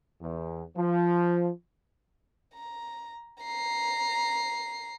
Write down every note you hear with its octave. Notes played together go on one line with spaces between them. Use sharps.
E2
F3
A#5
A#5 C7